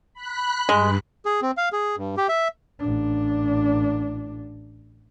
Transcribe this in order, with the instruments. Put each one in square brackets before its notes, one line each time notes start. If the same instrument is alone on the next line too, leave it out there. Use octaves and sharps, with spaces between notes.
[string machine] B5 F#6
[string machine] G2 [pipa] G#3
[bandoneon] G#4
C4
F5
G#4
G2
G4
E5
[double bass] A1 D4